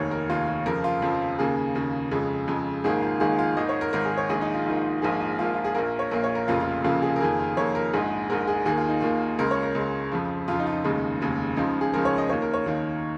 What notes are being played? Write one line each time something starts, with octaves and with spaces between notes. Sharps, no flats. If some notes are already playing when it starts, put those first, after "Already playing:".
Already playing: F1 D#2 D#3 C#5
A#4
F1 D#2 D#3 F4
F4
F2 C#3 F3 A#4
F4
F2 C#3 F3
D#2 C#3 A#3 G#4
D#2 C#3 A#3
F2 C#3 G#3
F2 C#3 G#3
G#1 G#2 D#3 A#3 G#4
F4
G#1 G#2 D#3 A#3 G#4
F4
G#1 G#2 D#3 D#5
C#5
A#4
G#1 G#2 D#3 A#4
G#4
C#5
A#1 G#2 D#3 G#4
D#4
F4
A#1 G#2 D#3
A#1 G#2 F3 A#3 G#4
F4
A#1 G#2 F3 A#3 F4
F4
G#4
A#1 A#2 A#3 A#4
C#5
A#1 A#2 A#3 A#4
C#5
A#4
F1 F2 C#3 A#3 F4
F4
F1 F2 C#3 A#3 F4
G#4
A#4
F2 D#3 A#3 G#4
F4
F2 D#3 A#3 C#5
A#4
A#1 G#2 G#3 G#4
A#1 G#2 G#3 A#4
G#4
D#2 D#3 A#3 G#4
F4
D#4
D#2 D#3 A#3 F4
C#2 C#3 G#3 A#4
C#5
A#4
C#2 C#3 G#3
F2 C#3 F3
F2 C#3 F3 F4
D#4
F4
D#4
F1 D#2 C#3 G#3
F1 D#2 C#3 G#3
C#2 C#3 F3 D#4
G#4
C#2 C#3 F3 A#4
C#5
D#5
D#2 D#3 A#3 C#5
A#4
C#5
D#2 D#3 A#3